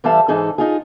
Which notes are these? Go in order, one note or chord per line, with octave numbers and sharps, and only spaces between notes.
E3 G3 A4 E5 F5 A5
G#2 E3 D#4 G#4 A4
D#4 F4 G#4